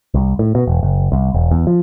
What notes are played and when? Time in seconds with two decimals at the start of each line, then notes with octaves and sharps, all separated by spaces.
0.14 C2
0.39 A2
0.55 B2
0.68 E1
0.83 F#1
1.12 C2
1.34 E1
1.51 E2
1.67 F3